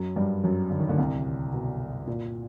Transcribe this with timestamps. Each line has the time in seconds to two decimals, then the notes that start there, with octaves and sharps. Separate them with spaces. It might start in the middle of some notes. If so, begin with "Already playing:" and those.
Already playing: F#2 F#3
0.16 G2 G3
0.44 F#2 F#3
0.70 D3
0.80 D#3
0.89 D2 D3
0.98 C2 C3
1.53 B2
2.07 A#2